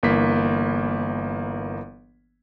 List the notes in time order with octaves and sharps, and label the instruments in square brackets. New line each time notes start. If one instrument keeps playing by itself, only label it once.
[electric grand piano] G1 E3 A#3 B6